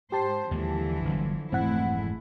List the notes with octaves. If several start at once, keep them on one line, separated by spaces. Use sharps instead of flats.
G#2 G4 C5 A5
D#2 D3 E3 F3 G#3 A#3
G1 C3 F#3
F1 G#2 E3 G#3 A3 C4 E4 F#5